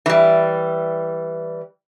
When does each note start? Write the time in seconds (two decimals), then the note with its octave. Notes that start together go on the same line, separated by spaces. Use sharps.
0.06 E3 G3